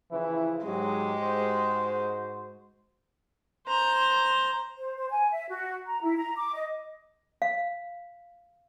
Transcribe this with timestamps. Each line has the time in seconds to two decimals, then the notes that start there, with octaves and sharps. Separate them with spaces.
0.11 C#3 E3 F3 E4
0.66 G#2 F#3 G#3 G4
1.22 G#2 F#4 C5
3.67 C5 A#5
4.77 C5
4.97 C5
5.10 G#5
5.32 E5
5.49 F#4
5.87 A#5
6.03 E4
6.17 A#5
6.36 D6
6.54 D#5
7.42 F5